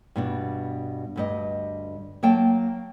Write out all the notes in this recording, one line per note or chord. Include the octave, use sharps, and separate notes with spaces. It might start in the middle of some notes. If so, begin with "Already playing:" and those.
G2 B2 D4
D2 G2 D#5
F#3 A#3 G5 A5